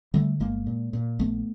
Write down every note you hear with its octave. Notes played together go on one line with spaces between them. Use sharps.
D3 G3 A3
G1 G#3 A#3
A#2
A#2
A#1 A3 B3